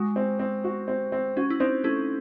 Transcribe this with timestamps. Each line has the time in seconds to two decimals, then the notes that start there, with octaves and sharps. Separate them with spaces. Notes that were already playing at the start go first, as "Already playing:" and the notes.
Already playing: G#3 F#4
0.16 C4
0.39 C4
0.64 F#4
0.88 C4
1.12 C4
1.37 C#4 F#4
1.50 E4
1.60 C4 D#4 C5
1.84 A3 C#4 E4